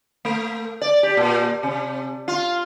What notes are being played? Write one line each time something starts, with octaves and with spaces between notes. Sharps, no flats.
A3
D5
G4
A#2
C3
F4